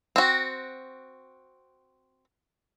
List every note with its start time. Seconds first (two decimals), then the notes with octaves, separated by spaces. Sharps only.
0.16 C4 F#4